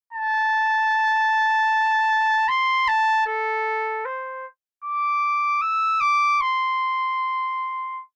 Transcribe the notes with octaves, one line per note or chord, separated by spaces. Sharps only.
A5
C6
A5
A4
C5
D6
E6
D6
C6